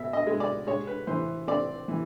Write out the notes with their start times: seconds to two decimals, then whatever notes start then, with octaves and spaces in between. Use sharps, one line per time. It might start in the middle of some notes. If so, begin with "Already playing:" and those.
Already playing: B2 E5
0.13 D#5
0.27 G#3
0.40 D5
0.67 G#3 C#5
0.87 B4
1.07 E3 C5
1.48 C4 D5
1.88 E3